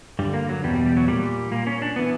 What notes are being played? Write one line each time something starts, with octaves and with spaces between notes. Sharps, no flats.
G2 D3 G3
A#3
F#3
E2 B2 G3
G3
G3
F#3
A#2 G3
A#2 A#3
C#4
D4
E3 B3